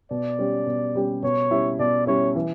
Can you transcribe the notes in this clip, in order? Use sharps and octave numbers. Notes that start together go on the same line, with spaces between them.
B2 D5
G3 C#4 G4
B2
G3 C#4 G4
B2 C#5
G3 C#4 E4
B2 D5
G3 C#4 E4 C#5
E3